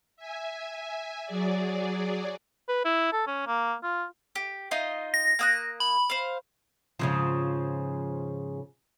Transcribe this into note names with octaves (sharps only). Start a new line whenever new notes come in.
E5 G#5
F#3 G#4 D5
B4
E4
A4
C#4
A#3
F4
G4
D#4 F4 D#5
A#6
A#3 D#6 F#6
B5
C5 F5
G#2 C#3 F3